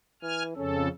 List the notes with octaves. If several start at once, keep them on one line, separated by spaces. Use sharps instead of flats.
E3 G#5 F6
F2 C#3 C#4 A4